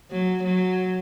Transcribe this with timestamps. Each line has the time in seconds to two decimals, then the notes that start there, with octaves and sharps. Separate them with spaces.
0.11 F#3
0.44 F#3